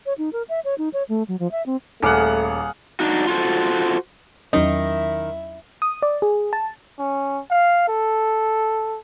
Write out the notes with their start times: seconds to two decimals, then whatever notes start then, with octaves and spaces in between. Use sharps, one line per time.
0.06 C#5
0.18 D#4
0.33 A#4
0.49 E5
0.65 C#5
0.78 D#4
0.93 C#5
1.09 A3
1.28 F#3
1.39 F3
1.52 E5
1.66 C4
2.03 D#1 A3 G#4 F5 F#5 D6
3.00 D4 D#4 F#4
3.27 F4 F#4 A4 C5
4.53 E2 D#3 F#3 C#4 D#4 E4 E5
5.82 D#6
6.02 D5
6.22 G#4
6.53 A5
6.99 C#4
7.50 F5
7.88 A4